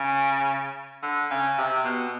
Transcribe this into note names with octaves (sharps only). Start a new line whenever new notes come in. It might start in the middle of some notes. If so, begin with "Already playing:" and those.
Already playing: C#3
D3
C#3
C3
B2